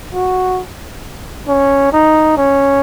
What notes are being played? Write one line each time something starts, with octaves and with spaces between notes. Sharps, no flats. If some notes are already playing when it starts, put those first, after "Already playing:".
F#4
C#4
D#4
C#4